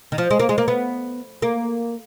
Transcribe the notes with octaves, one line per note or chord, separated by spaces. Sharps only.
D#3
F3
G#3
A#3
G#3
A#3
B3
A#3